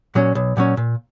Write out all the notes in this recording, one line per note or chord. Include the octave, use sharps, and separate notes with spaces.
A#2 F#3 C#4
B1
A#2 F#3 C#4
A#2